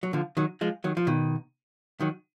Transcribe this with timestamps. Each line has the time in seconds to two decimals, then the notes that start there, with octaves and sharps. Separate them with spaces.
0.03 F#3
0.13 D3 F3
0.37 D#3 F#3
0.61 F3 G#3
0.84 D#3 F#3
0.97 F3
1.07 B2 D#3
2.00 D#3 F#3